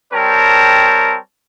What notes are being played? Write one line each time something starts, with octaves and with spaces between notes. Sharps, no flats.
G3 C4 A#4 C#5 A5